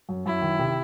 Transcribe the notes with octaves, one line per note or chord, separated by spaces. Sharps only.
F#2
F#2 E4
D#3
C3